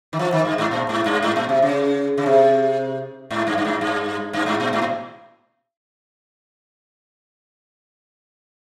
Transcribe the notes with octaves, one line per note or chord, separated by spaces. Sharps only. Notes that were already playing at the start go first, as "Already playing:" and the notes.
D#3
F3
D#3
G2
G#2
A#2
G#2
G2
G#2
A#2
C3
C#3
C#3
C3
G#2
G2
G2
G#2
G2
G2
G#2
A#2
G#2
A#2